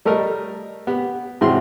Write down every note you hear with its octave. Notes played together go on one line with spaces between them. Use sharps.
G3 A3 A4 A#4 D#5
B3 G4
G#1 C3 E3 F#4 G#4 C6